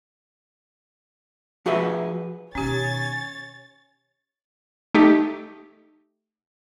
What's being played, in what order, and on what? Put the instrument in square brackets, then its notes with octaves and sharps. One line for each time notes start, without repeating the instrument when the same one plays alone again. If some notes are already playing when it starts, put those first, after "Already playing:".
[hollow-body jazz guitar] F3 F#4 G#4 B4 E5
[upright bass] B2 D#3 [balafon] C#4 G4 [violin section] C#5 A6 [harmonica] G#5
[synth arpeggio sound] A3 D#4 G4